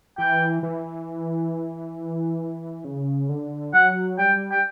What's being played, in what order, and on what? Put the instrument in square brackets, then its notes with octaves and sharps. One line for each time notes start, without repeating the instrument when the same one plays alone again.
[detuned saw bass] E3 [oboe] G5
[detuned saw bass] E3
C#3
D3
[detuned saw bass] F#3 [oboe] F#5
[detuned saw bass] G3 [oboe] G5
[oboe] G5